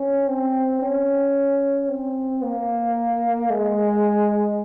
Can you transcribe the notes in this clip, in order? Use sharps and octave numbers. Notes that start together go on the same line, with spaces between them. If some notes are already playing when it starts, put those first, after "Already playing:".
Already playing: C#4
C4
C#4
C4
A#3
G#3